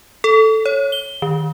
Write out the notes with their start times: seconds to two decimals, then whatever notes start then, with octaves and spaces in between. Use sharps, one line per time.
0.24 A4
0.66 C#5
0.92 G7
1.22 D#3